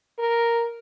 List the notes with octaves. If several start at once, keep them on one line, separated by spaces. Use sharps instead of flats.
A#4